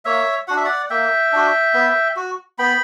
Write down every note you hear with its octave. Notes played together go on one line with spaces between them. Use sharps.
A#3 C#5 E5
D4 F#4 F#5
E5
D5 F#5
A#3 E5 G5
D4 F#4
B3
F#4
B3 G5 B5